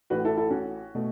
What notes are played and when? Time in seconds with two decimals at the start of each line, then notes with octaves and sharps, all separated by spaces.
0.10 A1 A2 A3 F#4 B4
0.25 E4 A4
0.37 E4 A4
0.50 C#4 F#4
0.95 B2 A3